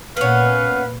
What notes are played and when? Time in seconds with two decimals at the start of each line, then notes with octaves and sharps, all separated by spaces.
0.17 A#2 B3 C#4 B4 F5